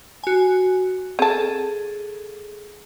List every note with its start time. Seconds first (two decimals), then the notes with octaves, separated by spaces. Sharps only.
0.24 F#4 G#5
1.19 C4 G#4 A4 A5